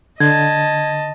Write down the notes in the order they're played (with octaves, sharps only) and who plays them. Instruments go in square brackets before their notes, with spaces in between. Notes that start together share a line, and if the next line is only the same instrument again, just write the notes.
[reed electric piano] D3 [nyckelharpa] D#5 A5 [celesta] G#6